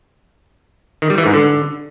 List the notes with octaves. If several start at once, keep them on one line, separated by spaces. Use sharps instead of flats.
D#3
G3
E3
G#2
D3